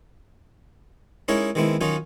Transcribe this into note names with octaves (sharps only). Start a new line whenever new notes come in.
G#3 C#4 D#4 E4 A#4 C#5
D#3 G#3 B3 C4 E4
D#3 F#3 C#4 D#4 F4